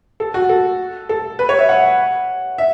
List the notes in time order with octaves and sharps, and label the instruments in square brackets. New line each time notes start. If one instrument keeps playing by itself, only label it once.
[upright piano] A4
F#4
A4
A4
B4
C#5
E5
F#5
E5